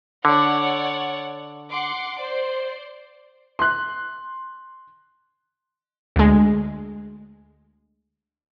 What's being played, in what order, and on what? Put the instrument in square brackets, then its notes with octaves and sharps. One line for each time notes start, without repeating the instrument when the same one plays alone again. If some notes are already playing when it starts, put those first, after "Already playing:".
[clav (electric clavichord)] D3 [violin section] C#5 D5 F#5
[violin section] F#5 C6 D6
C5 D5
[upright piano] C6 F#6
[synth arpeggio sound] D2 G#3